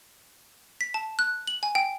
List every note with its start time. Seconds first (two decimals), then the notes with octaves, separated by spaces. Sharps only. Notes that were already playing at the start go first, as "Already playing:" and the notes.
0.81 B6
0.94 A5
1.19 F#6
1.47 F#7
1.63 G#5
1.75 G5